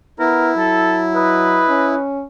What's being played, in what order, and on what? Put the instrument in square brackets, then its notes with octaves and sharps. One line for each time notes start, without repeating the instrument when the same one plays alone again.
[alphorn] B3 [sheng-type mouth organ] E4 [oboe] A#4
[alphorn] F#3 [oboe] A4
[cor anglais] B4 [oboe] D#5
[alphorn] C#4